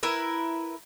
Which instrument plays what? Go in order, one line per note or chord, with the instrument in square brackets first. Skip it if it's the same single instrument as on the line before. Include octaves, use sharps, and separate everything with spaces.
[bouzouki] E4 A#4 B4